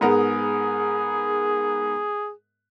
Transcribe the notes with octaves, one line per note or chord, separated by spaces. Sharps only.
G#2 B3 G#4 A#4